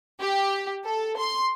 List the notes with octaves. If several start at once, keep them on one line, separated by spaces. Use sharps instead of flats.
G4
A4
C6